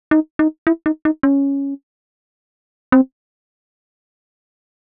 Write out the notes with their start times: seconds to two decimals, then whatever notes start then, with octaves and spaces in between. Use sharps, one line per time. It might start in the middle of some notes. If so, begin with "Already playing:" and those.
0.11 D#4
0.39 D#4
0.67 E4
0.86 D#4
1.05 D#4
1.23 C#4
2.92 C4